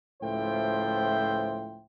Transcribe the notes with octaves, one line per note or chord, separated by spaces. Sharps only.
C#2 A2 F3 C5 E5 G5